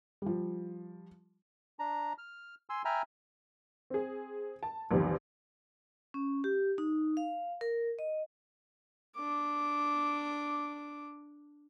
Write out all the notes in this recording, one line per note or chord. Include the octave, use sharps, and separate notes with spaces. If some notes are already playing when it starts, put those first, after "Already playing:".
F3 G3
D4 A#5
F6
G#5 C6 E6
E5 G5 G#5 A#5 B5 F6
C4 G#4
A5
A#1 E2 C3 D#3 F3 G3
C#4
G4
D#4
F5
A#4
D#5
D4 D6